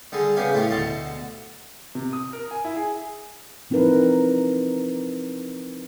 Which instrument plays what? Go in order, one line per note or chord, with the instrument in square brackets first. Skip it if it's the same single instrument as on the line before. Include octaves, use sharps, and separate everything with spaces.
[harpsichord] D3 G3 G#4
C#3 B3 G4 F5 G#5
A2 F4 G4 C#5
D2 B2 D3 A5 C6
[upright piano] C3
D#6
A#4
G#5
E4
G#4
[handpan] F3 C4 D#4 E4 A#4 B4